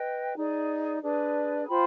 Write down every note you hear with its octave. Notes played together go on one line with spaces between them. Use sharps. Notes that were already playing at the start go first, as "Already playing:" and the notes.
Already playing: B4 D#5 G5
D#4 G#4 D5
D4 G#4 B4 D5
F4 C5 G5 B5